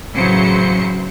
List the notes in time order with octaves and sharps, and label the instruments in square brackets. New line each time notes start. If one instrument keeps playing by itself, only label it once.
[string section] A1 C#3 E3 F#3 C5 C#7